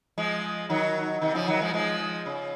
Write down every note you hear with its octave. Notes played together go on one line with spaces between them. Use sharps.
F3 G#3
D#3 F#3
C3 D#3
C#3 F3
D#3 F#3
F3 G#3
F3 G#3
C#3